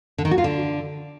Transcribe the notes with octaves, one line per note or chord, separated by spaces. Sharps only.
D3
D#3
F#4
F4
D3